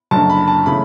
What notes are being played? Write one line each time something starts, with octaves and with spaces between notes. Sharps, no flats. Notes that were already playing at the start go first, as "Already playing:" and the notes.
F#1 F#2 D3 A5
B5
A5
C#3 E3 A3 B5